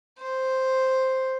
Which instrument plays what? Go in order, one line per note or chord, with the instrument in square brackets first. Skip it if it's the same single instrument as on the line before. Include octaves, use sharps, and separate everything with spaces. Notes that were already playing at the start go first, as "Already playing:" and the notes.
[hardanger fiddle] C5